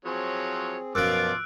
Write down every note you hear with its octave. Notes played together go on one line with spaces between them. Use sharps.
F3 F#3 C4 G#4 C#5
F#2 B2 F3 F4 D6 E6 F#6 D7